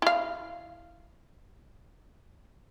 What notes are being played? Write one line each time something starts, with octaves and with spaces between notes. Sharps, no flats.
E4 F5